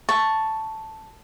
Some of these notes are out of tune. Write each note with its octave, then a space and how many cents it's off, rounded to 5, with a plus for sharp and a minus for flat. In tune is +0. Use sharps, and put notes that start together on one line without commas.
A5 +0 C#6 +0